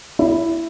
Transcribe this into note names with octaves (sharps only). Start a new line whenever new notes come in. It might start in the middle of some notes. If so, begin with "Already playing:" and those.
E4